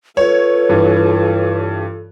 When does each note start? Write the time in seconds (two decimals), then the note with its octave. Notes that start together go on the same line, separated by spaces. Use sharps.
0.17 F4 A4 B4 C#5
0.69 G2 E3